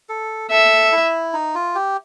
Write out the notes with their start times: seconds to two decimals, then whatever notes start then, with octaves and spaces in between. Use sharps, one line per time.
0.09 A4
0.51 A4 E5
0.92 E4
1.34 D#4
1.55 F4
1.75 G4